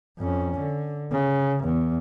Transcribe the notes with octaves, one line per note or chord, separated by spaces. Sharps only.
F2 C#4
D3
C#3
E2